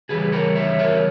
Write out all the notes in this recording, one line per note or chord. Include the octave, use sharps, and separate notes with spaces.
C#3 E3 G3 G#4 B4
A#4 C#5
C#5 E5
A#4 C#5